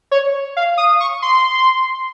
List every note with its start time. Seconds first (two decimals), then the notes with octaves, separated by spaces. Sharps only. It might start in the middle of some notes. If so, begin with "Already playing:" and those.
0.11 C#5
0.57 F5
0.77 D#6
1.00 C#6
1.22 C6